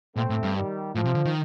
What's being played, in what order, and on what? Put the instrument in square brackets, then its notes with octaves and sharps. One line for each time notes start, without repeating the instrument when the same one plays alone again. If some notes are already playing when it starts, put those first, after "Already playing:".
[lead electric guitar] A#2 [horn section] A3 C4
[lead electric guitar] A2
G2
[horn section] D#3 G3
[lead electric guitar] A2 [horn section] F3
[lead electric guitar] C3
D3
D#3